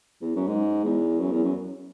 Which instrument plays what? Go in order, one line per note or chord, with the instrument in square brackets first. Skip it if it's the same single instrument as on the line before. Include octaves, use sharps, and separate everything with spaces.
[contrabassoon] E2
F#2
G#2
E2
F#2
E2
F#2